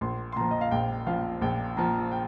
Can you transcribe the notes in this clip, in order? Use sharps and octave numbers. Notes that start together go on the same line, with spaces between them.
A#1 C6
C6
A#2 F3 A#5
D#5
F5
A#1 G5
A#2 F3 F5
A#1 G5
A#2 F3 A#5
G5